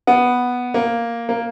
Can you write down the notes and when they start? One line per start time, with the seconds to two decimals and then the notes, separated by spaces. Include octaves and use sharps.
0.07 B3
0.74 A#3
1.29 A#3